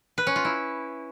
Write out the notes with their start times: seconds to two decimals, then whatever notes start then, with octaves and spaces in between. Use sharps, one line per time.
0.18 B4
0.27 C#4
0.36 F4
0.45 E4